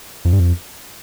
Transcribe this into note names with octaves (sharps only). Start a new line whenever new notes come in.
F2
G2
F2